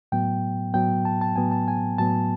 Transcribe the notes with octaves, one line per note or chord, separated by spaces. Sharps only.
A2 F#3 B3 G5
A2 F#3 B3 G5
A5
A5
A2 F#3 B3 G#5
A5
G#5
A2 F#3 B3 A5